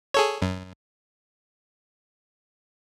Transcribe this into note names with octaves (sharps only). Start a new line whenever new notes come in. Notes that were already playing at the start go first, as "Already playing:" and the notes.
G#4 A4 C#5
F#2